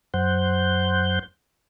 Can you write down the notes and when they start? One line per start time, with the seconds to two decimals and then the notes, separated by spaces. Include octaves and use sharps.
0.14 F#2 C5 F#5 G6